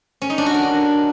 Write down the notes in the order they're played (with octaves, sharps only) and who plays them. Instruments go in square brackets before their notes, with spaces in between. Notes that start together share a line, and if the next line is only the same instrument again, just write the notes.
[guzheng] C#4
D#4
D4
F#4
A#4